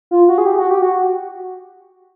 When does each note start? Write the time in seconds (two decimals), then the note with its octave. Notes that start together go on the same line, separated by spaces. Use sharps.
0.11 F4
0.29 F#4
0.38 G#4
0.46 G4
0.58 F#4
0.70 G4
0.82 F#4